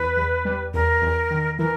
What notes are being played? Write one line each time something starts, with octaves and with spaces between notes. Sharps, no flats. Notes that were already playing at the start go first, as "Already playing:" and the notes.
Already playing: E2 B4
E2
G3
E2 A#4
E2
D#3
E3 A#4